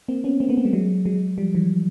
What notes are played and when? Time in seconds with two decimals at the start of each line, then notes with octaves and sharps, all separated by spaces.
0.08 A#3 C4
0.24 B3 C#4
0.40 A#3 C4
0.49 A3 B3
0.57 A#3 C4
0.65 G3 A3
0.73 F#3 G#3
1.05 F#3 G#3
1.38 F3 G3
1.55 E3 F#3